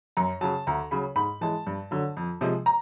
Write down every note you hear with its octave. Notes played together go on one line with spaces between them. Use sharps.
F#2 A#5
C#3 F#3 A5
D2 A#5
C#3 F#3 B5
G#2 B5
E3 G#3 A5
G2
D3 F#3
F2
C3 F3 G#3
A#5